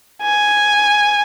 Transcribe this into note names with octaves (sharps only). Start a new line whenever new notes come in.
G#5